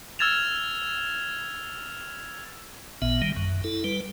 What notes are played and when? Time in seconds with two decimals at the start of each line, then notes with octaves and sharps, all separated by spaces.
0.19 E6 F6 G#6 A6 E7 F7
3.02 A1 A#2 B3 E5
3.22 D#3 G3
3.36 F#2
3.64 E4 A4
3.84 G3 B4